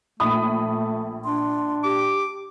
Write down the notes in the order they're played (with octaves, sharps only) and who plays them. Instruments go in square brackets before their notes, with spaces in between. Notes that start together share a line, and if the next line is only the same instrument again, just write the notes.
[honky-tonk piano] A#1 B5 D#6 [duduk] A3
[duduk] D4 [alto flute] C6
[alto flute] G4 [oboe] D6